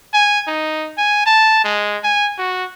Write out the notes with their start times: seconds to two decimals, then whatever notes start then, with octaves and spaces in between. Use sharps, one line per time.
0.14 G#5
0.47 D#4
0.97 G#5
1.26 A5
1.64 G#3
2.04 G#5
2.38 F#4